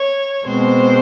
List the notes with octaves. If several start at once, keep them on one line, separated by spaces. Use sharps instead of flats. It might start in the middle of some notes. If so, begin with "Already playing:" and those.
Already playing: C#5
B2 G#3 C4 C5